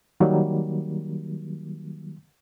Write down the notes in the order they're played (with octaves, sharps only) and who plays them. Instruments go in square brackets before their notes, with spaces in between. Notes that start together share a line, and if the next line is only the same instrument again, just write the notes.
[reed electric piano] D#3 F#3 G3 A#3